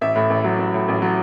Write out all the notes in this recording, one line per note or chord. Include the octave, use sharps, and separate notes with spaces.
A1 E5
A2
A1
F#3
A1
A2
A1
F#3